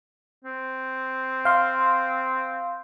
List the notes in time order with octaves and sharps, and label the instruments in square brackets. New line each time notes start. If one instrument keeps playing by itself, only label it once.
[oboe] C4
[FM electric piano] F5 C6